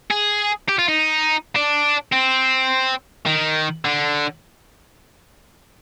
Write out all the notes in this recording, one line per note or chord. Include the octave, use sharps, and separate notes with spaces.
G#4
G4
F4
D#4
D4
C4
D#3
D3